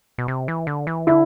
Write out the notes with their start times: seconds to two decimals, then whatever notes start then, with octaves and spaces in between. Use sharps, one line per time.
0.18 B2
0.28 C3
0.48 E3
0.67 D3
0.87 E3
1.07 D3 E4